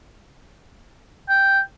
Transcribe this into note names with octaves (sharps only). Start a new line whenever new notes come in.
G5